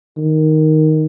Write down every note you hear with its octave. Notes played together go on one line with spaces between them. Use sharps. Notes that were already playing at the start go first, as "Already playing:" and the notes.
D#3